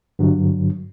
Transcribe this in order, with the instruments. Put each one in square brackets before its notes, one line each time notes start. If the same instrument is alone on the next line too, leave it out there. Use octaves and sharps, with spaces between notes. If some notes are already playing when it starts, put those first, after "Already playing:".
[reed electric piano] G2 D3 F#3